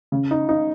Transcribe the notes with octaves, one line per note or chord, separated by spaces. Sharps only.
C#3
D#4
D#4